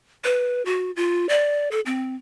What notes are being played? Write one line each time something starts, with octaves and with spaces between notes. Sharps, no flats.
B4
F#4
F4
D5
A4
C4